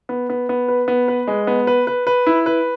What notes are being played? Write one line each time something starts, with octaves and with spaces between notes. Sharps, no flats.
B3
B3
B3
B4
B3
B4
G#3
B3
B4
B4
B4
E4
B4